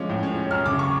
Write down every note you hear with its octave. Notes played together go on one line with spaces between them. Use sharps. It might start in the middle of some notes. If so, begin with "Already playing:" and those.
Already playing: F3 G#3 C#4 D6
A2
C#4
C#4
F#2 F6
C#3 D6
C#6